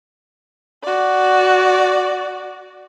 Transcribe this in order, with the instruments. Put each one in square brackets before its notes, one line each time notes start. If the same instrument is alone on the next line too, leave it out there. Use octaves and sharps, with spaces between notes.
[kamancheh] F#4 D5